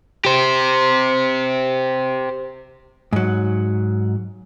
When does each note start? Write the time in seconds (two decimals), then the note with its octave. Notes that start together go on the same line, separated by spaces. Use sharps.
0.25 G4 C5
3.13 G#2 F#3